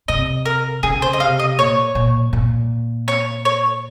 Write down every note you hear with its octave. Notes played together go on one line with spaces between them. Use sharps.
C3 D#5
A#4
C#3 G#4
C5
D#5
C3 F5
D#5
A#2 C#5
A#2
A#2
C#5
C#5